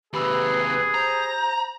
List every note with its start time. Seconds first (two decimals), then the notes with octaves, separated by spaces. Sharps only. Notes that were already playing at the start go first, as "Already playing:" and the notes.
0.13 D#2 C3 G4 G#4 B4 B5 E6
0.94 C5 A#5